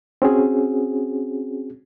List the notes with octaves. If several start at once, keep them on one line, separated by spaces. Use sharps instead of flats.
C4 C#4 F#4 G#4